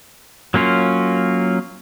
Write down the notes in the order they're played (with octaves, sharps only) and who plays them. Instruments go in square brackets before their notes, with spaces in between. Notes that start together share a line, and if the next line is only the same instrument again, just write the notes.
[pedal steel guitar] F#3 A#3 C#4 F4